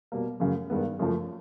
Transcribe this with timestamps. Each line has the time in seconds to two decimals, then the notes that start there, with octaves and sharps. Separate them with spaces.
0.12 B2 G3 A#3
0.40 F#2 C#3 F#3 A3
0.70 G2 D#3 G#3 B3
0.99 F#2 C#3 F3 A3